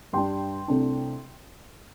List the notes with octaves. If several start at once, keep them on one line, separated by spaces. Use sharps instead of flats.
G2 G3 D4 G5 C6
C2 C3 A3 D4